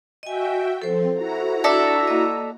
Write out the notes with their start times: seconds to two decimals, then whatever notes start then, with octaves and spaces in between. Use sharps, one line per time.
0.23 F#4 D#5 E5 G5 G#5
0.82 F3 C4 A4 C5
1.14 E4 F#4 A#5
1.64 D4 A4 D5 E5
2.08 A#3 D#5